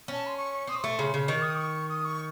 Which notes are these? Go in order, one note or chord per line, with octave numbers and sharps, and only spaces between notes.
C#4 A5
C6
C#6
C4 D#6
C6
A3 C#6
C#3 C6
C#3
D#3 C#6
D#6
C#6
D#6
C#6